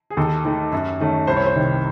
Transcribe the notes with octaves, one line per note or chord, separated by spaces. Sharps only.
G#4
D#2 A4
D#3 A3
F#2
D#3 A3 C#4
C2 C5
C#5
C5
C3 D#3